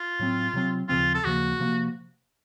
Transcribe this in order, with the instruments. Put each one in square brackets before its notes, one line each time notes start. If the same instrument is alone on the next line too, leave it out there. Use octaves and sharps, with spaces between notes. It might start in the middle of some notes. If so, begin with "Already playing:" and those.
Already playing: [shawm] F4
[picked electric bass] A2 F#3 C4
C3 F#3 C4
[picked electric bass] D#2 C#3 F3 C4 [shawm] F4
[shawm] A4
[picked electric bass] D#2 C#3 F3 A#3 [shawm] F#4
[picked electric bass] C3 F3 A#3